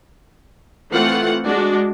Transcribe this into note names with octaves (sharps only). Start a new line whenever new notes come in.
E3 A3 C4 F4 F#5
G#3 D4 F#4